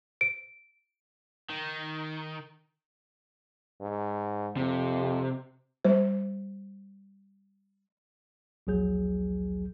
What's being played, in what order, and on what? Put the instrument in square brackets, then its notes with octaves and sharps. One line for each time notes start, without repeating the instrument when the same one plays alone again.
[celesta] D7
[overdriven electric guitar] D#3
[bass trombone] G#2
[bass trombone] F2 [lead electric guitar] C3
[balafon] G3 C5
[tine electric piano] A#1 D#2 F#3 G#4 G6